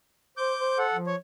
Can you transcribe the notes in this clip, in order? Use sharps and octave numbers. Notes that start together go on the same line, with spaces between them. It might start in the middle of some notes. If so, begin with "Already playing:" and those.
C5 D6 G6
C5
A4 F#5
F3
C#5